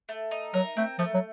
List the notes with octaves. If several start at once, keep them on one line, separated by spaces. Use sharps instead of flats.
A3
D#4
F#3 A#4
A3 C4
F3 A3
F#3